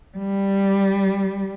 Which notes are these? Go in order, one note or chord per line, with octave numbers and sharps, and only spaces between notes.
G3